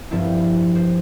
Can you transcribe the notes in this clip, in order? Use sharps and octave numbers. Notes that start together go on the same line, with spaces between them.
G2 F3 C4 E4
C5